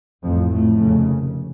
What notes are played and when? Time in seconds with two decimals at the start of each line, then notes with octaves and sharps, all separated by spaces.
0.23 A1 F2 G#2 F3
0.51 A2 A3
0.81 F1 D#2 C#3